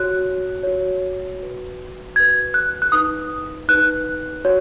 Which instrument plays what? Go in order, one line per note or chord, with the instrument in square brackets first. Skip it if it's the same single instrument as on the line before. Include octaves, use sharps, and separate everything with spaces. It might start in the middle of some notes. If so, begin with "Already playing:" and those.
Already playing: [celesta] F#4 C#5 F#6
F#4 C#5
F#4 B4
F#4 B4 G#6
F#6
F#6
D#4 B4 D#6
D#4 B4 F#6
F#4 C#5